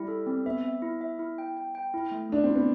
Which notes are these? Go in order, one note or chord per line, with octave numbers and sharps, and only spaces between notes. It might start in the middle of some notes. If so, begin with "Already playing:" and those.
Already playing: G3 E4
A4
C4
B3 E5
E5
E4
E5
E4
G5
G5
G5
E4
A3
A3 D4
C4 E4
B3